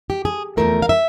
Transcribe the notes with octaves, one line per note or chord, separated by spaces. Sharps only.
G4
G#4
E2 C#3 F3 A3 A#4
F5
E5